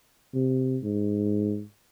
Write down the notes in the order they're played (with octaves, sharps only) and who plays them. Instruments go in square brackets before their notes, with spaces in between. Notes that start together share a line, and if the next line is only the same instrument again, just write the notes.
[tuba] C3
G#2